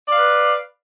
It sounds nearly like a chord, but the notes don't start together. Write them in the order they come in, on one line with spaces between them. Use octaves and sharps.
D5 F5 B4